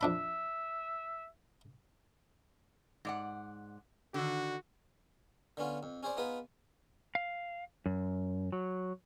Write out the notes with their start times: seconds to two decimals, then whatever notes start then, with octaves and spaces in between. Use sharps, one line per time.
0.01 F2 D4 E5 B5
3.05 G#2 D5 F#5
4.14 D3 D#3 F#4
5.57 D3 B3 C#4 F4
5.83 F2
6.03 C#4 G#4 C5 D5
6.17 B3 D#4 F4 G#4 B4
7.15 F5
7.86 F#2
8.52 F#3